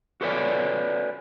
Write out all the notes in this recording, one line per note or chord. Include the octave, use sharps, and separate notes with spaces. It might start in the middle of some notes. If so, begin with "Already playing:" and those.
F#4 A4 B4 C#5 D5 G#5